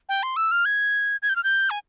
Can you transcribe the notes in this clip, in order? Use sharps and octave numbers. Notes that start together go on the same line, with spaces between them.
G5
C6
E6
F6
G#6
G#6
G6
F6
G6
G#5